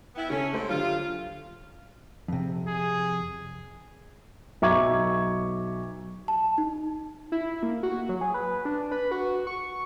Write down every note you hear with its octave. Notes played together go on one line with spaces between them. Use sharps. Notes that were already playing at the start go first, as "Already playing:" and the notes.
B3 E4 G5
C#3 C#4 A4
G#2 D3 G3 A3 C5
D3 F#3 F4 G4
F2 C3
G#4
B1 E5 A#5 C#6 D6 G#6
A5
D#4
E4
A#3
F#4
F#3
G#4
B4
D4
B4
F#4
C#6